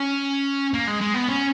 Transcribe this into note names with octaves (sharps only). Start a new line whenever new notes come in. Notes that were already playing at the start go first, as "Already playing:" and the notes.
Already playing: C#4
A#3
G#3
G#3
B3
C#4